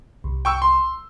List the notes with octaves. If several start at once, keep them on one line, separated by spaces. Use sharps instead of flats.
C2
G5 C#6 E6
C6